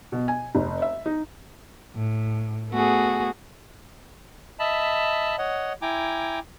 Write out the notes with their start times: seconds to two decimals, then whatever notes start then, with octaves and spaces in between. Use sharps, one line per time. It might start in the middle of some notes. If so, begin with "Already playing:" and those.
0.12 B2
0.28 G#5
0.55 F1
0.82 E5
1.06 D#4
1.95 A2
2.70 A3 B3 F#4 G#4
4.59 D#5 E5 A5 B5
5.38 C#5 D#5 F#5
5.82 E4 G5 G#5 A#5 D6